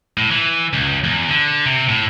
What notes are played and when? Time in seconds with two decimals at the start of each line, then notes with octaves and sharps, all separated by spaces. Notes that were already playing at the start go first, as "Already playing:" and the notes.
0.17 A2
0.31 E3
0.73 C#2
1.04 E2
1.29 D3
1.66 C3
1.89 A2